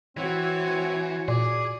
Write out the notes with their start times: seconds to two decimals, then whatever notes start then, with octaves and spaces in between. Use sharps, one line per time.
0.17 E3 C4 F#4 C#5
1.28 A#2 G#4 D5